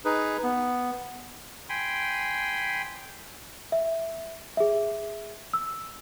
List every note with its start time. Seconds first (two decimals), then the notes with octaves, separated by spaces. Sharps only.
0.05 D#4 G#4 B4
0.43 B3
1.69 G5 G#5 B5 C6
3.72 E5
4.57 G#4 E5
5.54 E6